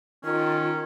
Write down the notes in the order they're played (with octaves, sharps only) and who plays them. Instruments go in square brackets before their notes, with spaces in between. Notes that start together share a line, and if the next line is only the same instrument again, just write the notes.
[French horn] D#3 [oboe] C#4 [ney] F4